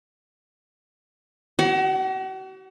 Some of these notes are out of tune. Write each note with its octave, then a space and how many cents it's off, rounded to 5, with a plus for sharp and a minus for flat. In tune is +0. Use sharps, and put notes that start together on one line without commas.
F#4 +45 F#5 +0